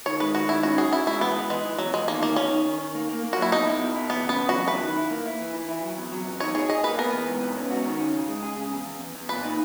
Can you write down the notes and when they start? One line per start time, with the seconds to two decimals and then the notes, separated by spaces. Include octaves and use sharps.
0.06 D#3 C#5
0.20 G#3 B4
0.34 D#3 F#4
0.49 D#3 E4
0.63 C#4 F#4
0.78 F#4 G#4
0.93 E4 F#4
1.07 G#3 E4
1.21 E3 B3
1.36 E3
1.50 E3 G#3
1.64 E3
1.78 E2 F#3
1.93 E2 G#3
2.08 D#3 A#3
2.22 E2 A#3
2.36 C#4 D#4
2.51 D#3
2.66 D#3
2.80 D#3
2.95 A#3
3.09 A#3
3.23 A#3
3.33 F#4
3.38 F#3 E4
3.52 B2 D#4
3.66 E4
3.81 B2
3.95 E4
4.10 E2 B3
4.25 C#3 B3
4.39 E2
4.49 F#3 F#4
4.67 E4 B4
4.82 D#3
4.97 E4
5.11 A#3
5.26 E4
5.40 E3
5.54 E3
5.69 E4
5.83 F#3
5.97 E2
6.12 F#3
6.26 E2
6.40 D#4 C#5
6.55 G#4 C#5
6.69 G#4 D#5
6.84 A#3 B4
6.98 B3 A#4
7.13 E3
7.28 G#2
7.42 B3
7.56 C#4
7.71 F#4
7.85 D#3
8.00 C#4
8.14 C#3
8.29 G#3
8.43 G#4
8.56 C#3
8.71 E2
8.86 E2
9.01 E2
9.15 E2
9.29 A#2 B4
9.43 D#4